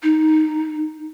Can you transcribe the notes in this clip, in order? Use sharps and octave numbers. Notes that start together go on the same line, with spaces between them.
D#4